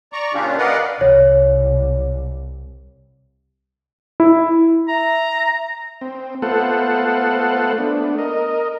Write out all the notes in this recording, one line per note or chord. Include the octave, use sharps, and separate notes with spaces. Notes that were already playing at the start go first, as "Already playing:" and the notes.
D5 A#5 C#6
A#2 C#3 C#4 D4 F4 G4
A#4 B4 D5 D#5 F5 F#5
C2 C#5
E4
E5 A#5
C4
A3 B3 F4 A4 C5 F#5
A3 B3 D4
A#4 D#5